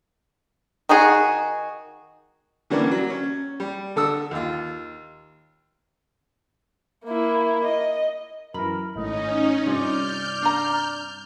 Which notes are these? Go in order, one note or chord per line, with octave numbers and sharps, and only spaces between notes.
D#3 D#4 F#4 G#4
D3 E3 G3 A#3 C#4 D4
F#3
C#4
G3
D3 A4 D#6 E6
D#2 F4
A#3 E4
D#5
F#2 E3 A#4 B5
G#1 A2 C#4 D#4 D#5
G2 C3 F4 D5 F6 G6
D4 A#5